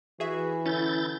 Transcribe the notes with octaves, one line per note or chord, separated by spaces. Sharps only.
E3 F#4 G#4 E5
D3 C#4 E4 G6 A6